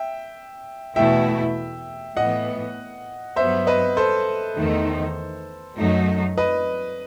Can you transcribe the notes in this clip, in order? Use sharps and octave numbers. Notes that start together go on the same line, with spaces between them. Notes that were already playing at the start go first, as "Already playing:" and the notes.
Already playing: E5 G5
E2 B2 A3 E4 E5 G5
A2 E3 B3 D#5 F#5
G2 F#3 B3 C5 E5
B4 D#5
A4 C5
E2 D#3 A3 D#4
F#2 F#3 A3 D#4
B4 D#5